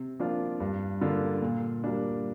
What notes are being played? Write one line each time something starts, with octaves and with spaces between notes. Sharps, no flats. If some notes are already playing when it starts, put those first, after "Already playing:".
Already playing: C3
F3 A#3 D4 F4
G2
D3 A#3 D4 F4
A#2
G3 A#3 D4